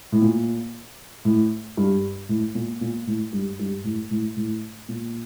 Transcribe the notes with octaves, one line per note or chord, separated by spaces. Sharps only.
A2
A#2
A2
G2
A2
A#2
A#2
A2
G2
G2
A2
A2
A2
A#2